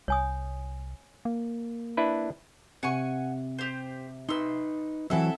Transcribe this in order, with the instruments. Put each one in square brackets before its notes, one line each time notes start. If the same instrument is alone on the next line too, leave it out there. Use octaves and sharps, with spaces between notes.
[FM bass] C2 [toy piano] C#5 G#5 D#6
[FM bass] A#3
[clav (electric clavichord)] D4 E4 B4
[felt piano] C3 [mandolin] F#5 G#5 C#6
[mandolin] G4 C5
[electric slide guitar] D#4 B4 [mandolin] C6 E6
[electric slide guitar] E3 F#3 [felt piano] C4 F#5 G#5 [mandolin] E4 A4 E5